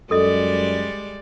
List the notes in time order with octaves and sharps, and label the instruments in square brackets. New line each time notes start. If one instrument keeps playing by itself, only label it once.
[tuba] F#2 [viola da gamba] G3 G#3 D5 [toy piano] A4 D#5